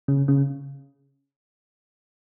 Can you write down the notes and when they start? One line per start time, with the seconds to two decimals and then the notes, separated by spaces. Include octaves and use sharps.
0.08 C#3
0.28 C#3